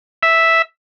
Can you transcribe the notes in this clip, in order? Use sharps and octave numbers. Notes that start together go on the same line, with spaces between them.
E5